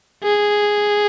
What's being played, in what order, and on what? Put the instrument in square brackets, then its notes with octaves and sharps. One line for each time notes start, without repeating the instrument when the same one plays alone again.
[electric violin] G#4